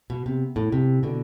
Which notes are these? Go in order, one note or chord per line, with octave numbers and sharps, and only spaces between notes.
B2
C3
A2
C3
B2 D3